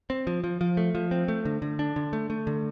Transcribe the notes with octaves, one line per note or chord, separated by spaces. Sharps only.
C4
F3
F3
F3
A3
F3
C4
A3
D3
D3
D4
D3
A3
A3
D3